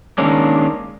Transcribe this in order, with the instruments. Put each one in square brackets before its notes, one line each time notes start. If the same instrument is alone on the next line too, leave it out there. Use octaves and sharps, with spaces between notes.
[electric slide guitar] D#3 G#3 A#3 C#4 D4